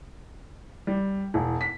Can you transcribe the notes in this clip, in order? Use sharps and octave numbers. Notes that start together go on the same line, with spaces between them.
G3
E1
B6